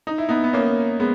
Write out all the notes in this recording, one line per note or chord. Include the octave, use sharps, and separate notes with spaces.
D#4
E4
B3 D#4
B3
A#3 C#4
G#3 B3